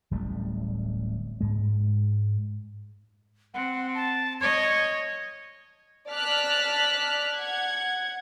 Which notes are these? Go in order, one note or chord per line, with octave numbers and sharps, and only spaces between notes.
D1 A1 G3 A3
G#2 G#3
C4 F#5
A5
C#5 D#5 G#6
D5 A5 F6 F#6 B6
F#5 G#6